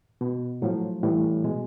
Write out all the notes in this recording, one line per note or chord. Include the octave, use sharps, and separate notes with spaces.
B2
A2 F3 F#3
A2 E3 G3
B2 G#3